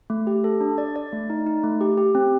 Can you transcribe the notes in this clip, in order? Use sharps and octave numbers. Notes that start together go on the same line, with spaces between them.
A3
G4
A4
D4
D5
D5
A3
D#4
D#4
A3
G4
G4
C4